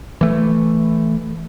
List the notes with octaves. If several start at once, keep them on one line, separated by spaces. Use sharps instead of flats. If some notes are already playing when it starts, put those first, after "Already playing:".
E3 A3